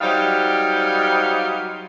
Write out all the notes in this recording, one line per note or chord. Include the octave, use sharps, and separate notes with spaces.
F#3 G3 D#4 G4 C5 F5